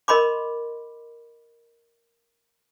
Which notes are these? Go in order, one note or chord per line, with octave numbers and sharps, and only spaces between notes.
A#4 D#5 B5 C6 D6